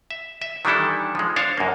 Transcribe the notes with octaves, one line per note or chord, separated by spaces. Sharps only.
E5
E5
D#3 E3 G3 D4 E4 A4
F3 G#3
D4 C5 C#5 F5
F#2 A#3